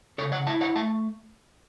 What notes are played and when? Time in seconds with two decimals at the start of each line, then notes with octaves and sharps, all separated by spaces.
0.18 C#3 A4 C#5
0.32 C#5 F#5
0.47 E4 E5 A5
0.61 C#5 F#5
0.76 A3 E5 A5